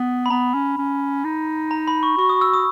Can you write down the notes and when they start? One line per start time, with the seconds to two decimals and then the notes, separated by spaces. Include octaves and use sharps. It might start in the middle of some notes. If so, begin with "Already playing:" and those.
Already playing: B3
0.26 B5
0.30 B3 A#5
0.54 C#4
0.78 C#4
1.25 D#4
1.71 A#5
1.88 B5
2.03 C#6
2.18 F#4 C#6
2.29 D#6
2.41 E6
2.54 D#6